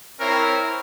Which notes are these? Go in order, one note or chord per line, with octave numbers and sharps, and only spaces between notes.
C4 E4 A#4 C#5